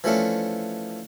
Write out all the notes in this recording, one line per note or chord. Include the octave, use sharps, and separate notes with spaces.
E3 F3 A3 C#4 D4